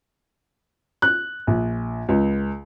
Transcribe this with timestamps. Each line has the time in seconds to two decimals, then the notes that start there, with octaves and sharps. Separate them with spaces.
1.02 F#6
1.47 A#1
2.09 C#2